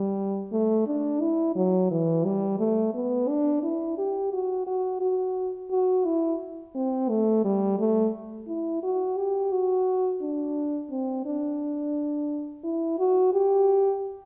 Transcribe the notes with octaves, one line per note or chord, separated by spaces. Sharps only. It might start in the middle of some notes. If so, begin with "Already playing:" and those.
Already playing: G3
A3
D4
E4
F#3
E3
G3
A3
B3
D4
E4
G4
F#4
F#4
F#4
F#4
E4
C4
A3
G3
A3
E4
F#4
G4
F#4
D4
C4
D4
E4
F#4
G4